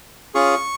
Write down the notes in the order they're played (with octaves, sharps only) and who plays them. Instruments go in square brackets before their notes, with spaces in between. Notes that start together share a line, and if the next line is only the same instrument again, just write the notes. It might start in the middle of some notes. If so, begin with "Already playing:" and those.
[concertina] C#4 F4 G#4 C#6